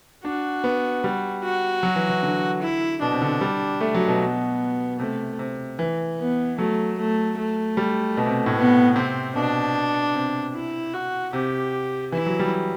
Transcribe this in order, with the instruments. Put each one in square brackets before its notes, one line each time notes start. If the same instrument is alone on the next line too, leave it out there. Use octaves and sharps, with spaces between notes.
[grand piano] D4 [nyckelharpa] F#4
[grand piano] B3
G3
[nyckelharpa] F#4
[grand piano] F#3
E3
E3
D3
[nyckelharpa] E4
[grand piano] B2 [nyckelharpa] D4
[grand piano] C3
D3
G3
A3
F#3
B2
[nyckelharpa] B3
[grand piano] C3 [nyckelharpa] A3
[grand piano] C3
E3
[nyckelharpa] B3
[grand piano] F#3 [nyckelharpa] A3
[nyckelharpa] A3
A3
[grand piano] G3
B2
C3
A2
[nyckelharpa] B3
[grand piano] C3 [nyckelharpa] C4
[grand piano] B2 [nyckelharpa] D4
[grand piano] C3
[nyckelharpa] E4
F#4
[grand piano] C3 [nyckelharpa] G4
[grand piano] E3 [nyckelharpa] E4
[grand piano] F#3
G3